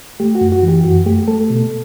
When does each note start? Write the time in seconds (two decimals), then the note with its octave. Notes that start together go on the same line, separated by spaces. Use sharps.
0.20 A3 G4
0.35 F#4
0.41 F#2
0.52 F#4
0.63 E3
0.68 G4
0.85 F#2 F#4
1.06 A3 G4
1.28 A3 A4
1.50 B2